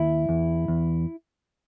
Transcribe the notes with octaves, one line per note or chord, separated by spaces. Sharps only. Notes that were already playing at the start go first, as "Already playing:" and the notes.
Already playing: D#2 E4
E2
E2